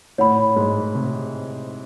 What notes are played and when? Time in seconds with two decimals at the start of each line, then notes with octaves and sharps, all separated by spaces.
0.18 A2 C#5 F#5 B5
0.56 G#2
0.95 C3